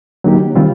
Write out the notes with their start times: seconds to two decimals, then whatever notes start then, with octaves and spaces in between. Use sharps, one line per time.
0.24 D3 F#3 A#3 D#4 G4
0.55 C3 D#3 G3 C4 F4